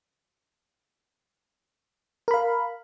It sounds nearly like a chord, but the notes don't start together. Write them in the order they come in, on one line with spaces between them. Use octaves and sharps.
A#4 B5 F5